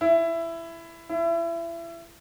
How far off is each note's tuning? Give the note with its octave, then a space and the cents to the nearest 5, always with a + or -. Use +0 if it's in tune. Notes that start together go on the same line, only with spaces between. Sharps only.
E4 +15
E4 +30